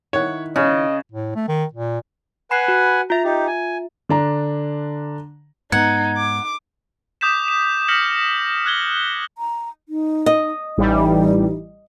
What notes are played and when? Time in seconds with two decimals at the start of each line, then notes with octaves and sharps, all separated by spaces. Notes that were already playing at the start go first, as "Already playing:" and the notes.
0.13 D#3 E4 C#5 F#5
0.56 C#3 C#4 D#5
1.12 A2
1.35 A3
1.48 D#3
1.73 A#2
2.51 B4 F#5 G#5 B5 C7
2.68 F#4
3.10 F4 E5 A#5
3.24 D#4 G4
3.47 G#5
4.09 D3 D4 A#5
5.72 G#2 B3 D#4 F#5 G#6
6.17 D6
7.21 D6 D#6 G6 B6 E7
7.48 E7
7.88 F6 G6 A#6 B6 C#7 F#7
8.66 F#6 G#6 G7
9.38 A#5
9.89 D#4
10.26 D#5
10.78 A1 E3 G3 D#4